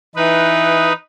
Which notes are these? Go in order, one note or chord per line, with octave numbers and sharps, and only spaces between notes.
E3 D#4 B4